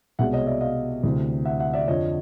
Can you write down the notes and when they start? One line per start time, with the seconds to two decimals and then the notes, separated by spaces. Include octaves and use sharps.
0.19 C2 B2 G#3 E5 F#5
0.33 C#5 D#5
0.47 D5 E5
0.61 D#5 F5
1.04 D2 C3 E3
1.45 E5 F#5
1.60 E5 F#5
1.74 D5 E5
1.88 F2 D3 F3 C#5 D#5